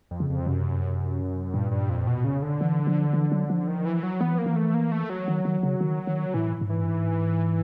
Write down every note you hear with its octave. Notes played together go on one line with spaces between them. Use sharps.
F2
C#3
F2
F#2 C3
G2 A#2
G2
F2
B2
C#3
D3
E3
F3
E3
F#3
F3
D#3
E3
F#3
E3 B3
F3 A#3
E3
A3
A#3
A3
F#3
D#3
D#3
C#3
D#3
D#3
A2 E3
G#2
E3
G2
G#2